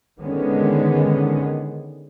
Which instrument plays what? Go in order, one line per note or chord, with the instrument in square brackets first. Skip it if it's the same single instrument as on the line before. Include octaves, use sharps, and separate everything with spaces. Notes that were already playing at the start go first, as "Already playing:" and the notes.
[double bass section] D3 D#3 G#3 B3 C#4